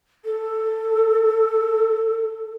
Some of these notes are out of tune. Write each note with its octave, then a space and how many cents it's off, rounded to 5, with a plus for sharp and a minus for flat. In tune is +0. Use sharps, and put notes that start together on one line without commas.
A4 +10